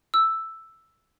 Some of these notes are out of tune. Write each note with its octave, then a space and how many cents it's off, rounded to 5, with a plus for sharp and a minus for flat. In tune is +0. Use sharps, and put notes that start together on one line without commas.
E6 +5